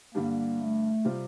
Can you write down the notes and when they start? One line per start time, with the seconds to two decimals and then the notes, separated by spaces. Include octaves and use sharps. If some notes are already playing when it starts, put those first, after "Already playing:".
0.14 G2 D3 G3 A#3 D4
0.60 A3
1.05 C3 G3 C4 F4